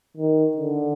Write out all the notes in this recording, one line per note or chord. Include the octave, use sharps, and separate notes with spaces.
D#3
D3